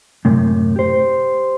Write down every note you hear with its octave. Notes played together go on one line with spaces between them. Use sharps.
F#2 A2 C3
G4 C5